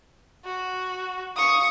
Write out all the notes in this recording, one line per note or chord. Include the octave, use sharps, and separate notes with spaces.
F#4
F5 C#6 D#6